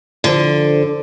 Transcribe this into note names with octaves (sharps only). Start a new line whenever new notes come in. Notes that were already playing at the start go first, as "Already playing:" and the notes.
D3 F3 C5